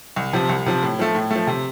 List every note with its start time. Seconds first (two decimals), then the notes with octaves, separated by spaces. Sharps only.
0.16 C2
0.33 C3 F3
0.49 C2
0.66 C3 F3
0.83 A2
0.99 F3 A3
1.15 A2
1.31 F3 A3
1.47 C3